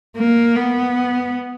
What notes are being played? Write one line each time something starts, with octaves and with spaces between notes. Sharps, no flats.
A#3
B3